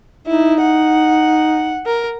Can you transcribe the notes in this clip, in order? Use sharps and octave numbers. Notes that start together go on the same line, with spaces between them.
D#4 E4
F#5
A#4